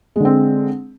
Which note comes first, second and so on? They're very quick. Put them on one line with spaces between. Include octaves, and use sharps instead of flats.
G#3 D3 C4